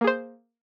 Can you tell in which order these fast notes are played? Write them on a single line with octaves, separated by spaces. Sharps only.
A#3 G#4 C5